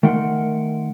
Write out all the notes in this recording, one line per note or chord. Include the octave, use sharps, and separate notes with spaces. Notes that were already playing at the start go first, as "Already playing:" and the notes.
D#3 A3 A#4 F#5 C6